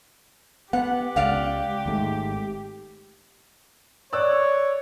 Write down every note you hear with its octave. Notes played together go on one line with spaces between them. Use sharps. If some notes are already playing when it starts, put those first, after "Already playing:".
B3 G4 F#5
C#2 D5 F5 F#5
G#1 G#2 A3
C#5 D5 E6 F#6